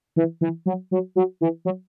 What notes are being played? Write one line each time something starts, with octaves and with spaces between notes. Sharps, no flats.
E3
E3
F#3
F#3
F#3
E3
F#3